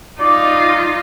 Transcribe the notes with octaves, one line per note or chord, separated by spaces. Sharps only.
D#4 F4 D5